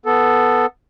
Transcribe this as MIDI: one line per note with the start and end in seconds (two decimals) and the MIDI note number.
0.06 0.66 59
0.06 0.66 69